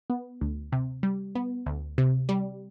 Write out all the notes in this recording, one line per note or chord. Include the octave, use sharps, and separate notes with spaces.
B3
D2
C3
G3
B3
D2
C3
G3